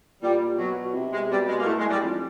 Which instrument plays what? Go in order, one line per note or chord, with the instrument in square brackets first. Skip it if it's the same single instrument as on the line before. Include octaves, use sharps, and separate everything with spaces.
[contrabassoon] A#2 [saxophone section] G3
[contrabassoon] B2 [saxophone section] F#3
[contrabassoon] C3
[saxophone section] G#3
[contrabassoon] B2 [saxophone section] G3
[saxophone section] G#3
A#3
[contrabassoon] A2 [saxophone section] A3
[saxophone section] G#3
G3
[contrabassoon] F2